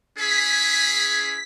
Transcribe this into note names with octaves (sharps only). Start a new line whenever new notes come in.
C#4 E4 G#4 B6